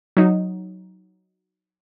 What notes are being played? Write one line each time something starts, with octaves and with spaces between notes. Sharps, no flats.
F#3 D#4